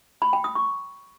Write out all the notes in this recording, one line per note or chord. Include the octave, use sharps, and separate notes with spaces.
B5
G5
D#6
C#6